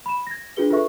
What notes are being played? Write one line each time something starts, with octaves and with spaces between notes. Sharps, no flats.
B5 E7
G#6 A#6
D4 F4 F#4 G#4 B4 G7
F4 A4 B4 E5 C#6